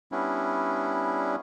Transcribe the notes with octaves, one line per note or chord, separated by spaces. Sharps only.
G3 B3 C#4 D4 E4